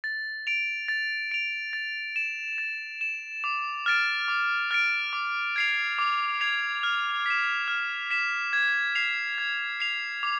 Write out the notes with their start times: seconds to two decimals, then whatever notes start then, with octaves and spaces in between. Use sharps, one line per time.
0.04 A6
0.47 D7 F7
0.88 A6
1.31 D7 F7
1.73 A6
2.16 E7
2.58 A6
3.01 E7
3.44 D6
3.86 F6 A6 D7
4.28 D6
4.71 F6 A6 D7
5.13 D6
5.56 G#6 C7 F7
5.98 D6
6.41 G#6 C7 F7
6.83 F6
7.26 B6 E7
7.68 F6
8.11 B6 E7
8.53 G#6
8.95 C7 F7
9.38 G#6
9.80 C7 F7
10.23 D6